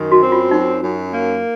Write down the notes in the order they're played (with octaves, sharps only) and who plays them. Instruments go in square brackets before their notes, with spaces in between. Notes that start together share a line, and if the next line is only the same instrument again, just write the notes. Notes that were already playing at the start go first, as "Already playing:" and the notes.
Already playing: [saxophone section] F#2 D#3
[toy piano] F#4
[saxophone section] C4
[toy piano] F4
[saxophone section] F#2 [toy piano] D#4
[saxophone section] F#2
A#3